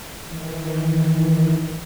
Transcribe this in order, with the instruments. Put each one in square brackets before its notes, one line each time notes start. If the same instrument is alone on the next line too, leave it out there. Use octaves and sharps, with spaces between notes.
[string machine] D#3 E3